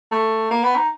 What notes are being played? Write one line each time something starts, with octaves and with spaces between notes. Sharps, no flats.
A3
A#3
B3
D#4